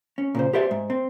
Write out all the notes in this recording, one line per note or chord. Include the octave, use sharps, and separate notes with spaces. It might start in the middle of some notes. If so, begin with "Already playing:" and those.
C#4
A#2 C#3 C5
G4 B4 C5 D5 E5
G#2
C4